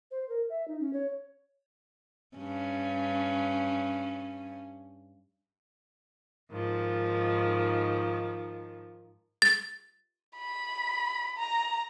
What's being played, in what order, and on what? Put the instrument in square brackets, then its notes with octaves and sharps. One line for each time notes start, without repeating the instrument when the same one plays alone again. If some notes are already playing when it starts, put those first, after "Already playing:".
[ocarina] C5
A#4
E5
D#4
C#4
C#5
[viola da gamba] G2 C#4
[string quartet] G#2 D#3 F3
[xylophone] A6
[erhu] B5
A#5